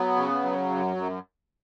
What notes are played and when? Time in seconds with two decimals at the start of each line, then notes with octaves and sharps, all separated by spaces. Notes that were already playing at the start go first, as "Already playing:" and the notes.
Already playing: F#3 B3
0.16 C#3
0.43 F#3
0.69 F#2
0.96 F#2